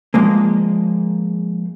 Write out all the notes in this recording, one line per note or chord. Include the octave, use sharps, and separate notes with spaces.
F3 G#3 A#3